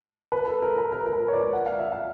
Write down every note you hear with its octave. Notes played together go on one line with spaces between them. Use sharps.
B4
A4
A#4
B4
A#4
A#4
B4
C#5
D5
F#5
F5
E5
F5